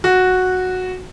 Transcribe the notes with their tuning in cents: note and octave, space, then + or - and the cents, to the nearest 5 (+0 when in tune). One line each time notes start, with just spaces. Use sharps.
F#4 -5